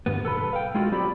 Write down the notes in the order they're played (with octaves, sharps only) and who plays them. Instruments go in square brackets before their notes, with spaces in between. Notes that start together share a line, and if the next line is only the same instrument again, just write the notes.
[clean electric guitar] D2 G2 B3
B1 A4 B4 B5
F5 G5
G#3 F4 F#4 A4
F#3 C4 G4 D5 B5